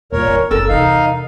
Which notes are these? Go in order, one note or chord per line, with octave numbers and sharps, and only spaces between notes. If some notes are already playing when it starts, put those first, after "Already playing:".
E2 A#2 G#3 A#4 C#5
D#3
F#1 A4 A#4 E6
E2 C3 D#4 F5